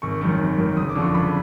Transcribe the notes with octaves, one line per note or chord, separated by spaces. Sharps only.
G#1 C#6
F#2 D#3
G#1
F#2 D#3
F#1 D#6
D6
F2 D3 F3
C#6
F#1 B5